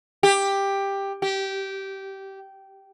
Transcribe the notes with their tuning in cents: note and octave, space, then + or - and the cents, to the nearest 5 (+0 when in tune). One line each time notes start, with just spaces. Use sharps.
G4 +10
G4 -15